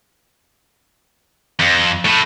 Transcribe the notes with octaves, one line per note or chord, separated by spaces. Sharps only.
F2
A2